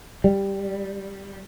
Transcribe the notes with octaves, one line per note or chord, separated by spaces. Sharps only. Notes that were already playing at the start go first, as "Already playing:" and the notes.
G3